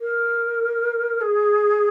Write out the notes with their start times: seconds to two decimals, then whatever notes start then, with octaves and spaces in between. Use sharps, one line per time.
0.01 A#4
1.21 G#4